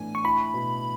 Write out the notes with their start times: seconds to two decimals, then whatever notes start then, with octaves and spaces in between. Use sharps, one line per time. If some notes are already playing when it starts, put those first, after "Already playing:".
Already playing: A2 E3 B3 D4 G#5
0.15 C#6
0.24 E4 B5
0.54 B2